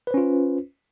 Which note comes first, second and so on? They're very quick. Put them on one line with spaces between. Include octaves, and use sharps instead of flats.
B4 C5 C#4 F4